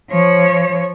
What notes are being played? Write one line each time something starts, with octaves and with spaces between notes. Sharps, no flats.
F3 C#5